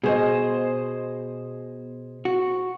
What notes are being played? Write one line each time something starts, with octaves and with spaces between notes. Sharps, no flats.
B2 G#4 C5 D#5
F#4